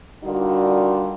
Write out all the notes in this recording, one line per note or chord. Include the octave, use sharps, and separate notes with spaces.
D3 G3 D#4 F4 F#4 A#4